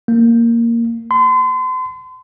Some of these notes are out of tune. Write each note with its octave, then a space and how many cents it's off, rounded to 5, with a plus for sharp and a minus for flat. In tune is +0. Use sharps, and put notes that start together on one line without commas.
A#3 -5
C6 -40